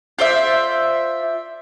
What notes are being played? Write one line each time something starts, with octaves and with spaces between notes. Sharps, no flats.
F4 C5 D5 E5